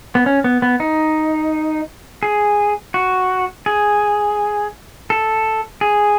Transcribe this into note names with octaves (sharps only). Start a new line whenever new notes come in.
B3
C#4
B3
B3
D#4
G#4
F#4
G#4
A4
G#4